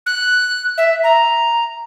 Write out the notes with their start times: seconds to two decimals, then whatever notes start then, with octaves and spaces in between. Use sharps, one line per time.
0.06 F#6
0.77 E5
1.03 A#5